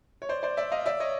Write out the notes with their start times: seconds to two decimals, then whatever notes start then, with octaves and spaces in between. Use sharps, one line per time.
0.22 C#5
0.29 C5 D5
0.43 C5 D5
0.57 D5 E5
0.72 D#5 F5
0.86 D5 E5
1.00 C#5 D#5